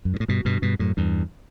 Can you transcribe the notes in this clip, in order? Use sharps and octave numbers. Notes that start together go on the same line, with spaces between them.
F#2
G2
A2
G2 B2
G2 B2
G2 B2
F#2 A2
E2 G2